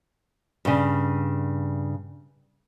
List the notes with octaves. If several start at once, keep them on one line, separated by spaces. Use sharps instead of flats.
G2 C#3